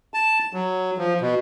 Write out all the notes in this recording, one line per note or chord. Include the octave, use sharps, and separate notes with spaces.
A5
F#3
F3
B2